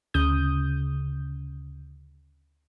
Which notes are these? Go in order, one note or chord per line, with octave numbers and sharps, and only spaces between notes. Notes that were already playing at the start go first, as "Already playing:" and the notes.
D2 C#3 D#6 G6